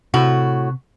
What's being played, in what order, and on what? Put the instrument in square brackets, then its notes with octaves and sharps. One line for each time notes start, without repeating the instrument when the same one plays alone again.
[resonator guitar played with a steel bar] A2 F#4 [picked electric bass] C3